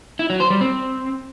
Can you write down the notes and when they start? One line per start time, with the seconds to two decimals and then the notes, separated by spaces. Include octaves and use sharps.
0.19 E4
0.30 F#3
0.40 C5
0.50 G3
0.61 C4